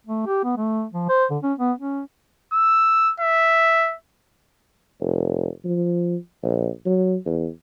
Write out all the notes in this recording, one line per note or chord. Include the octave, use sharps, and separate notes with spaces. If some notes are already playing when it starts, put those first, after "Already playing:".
A3
G4
B3
A3
F3
C5
D3
C#4
B3
C#4
E6
E5
F1
F3
A#1
F#3
E2